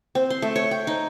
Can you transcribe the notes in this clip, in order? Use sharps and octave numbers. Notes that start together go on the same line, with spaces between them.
C4
C6
A3
C#5
G5
D#4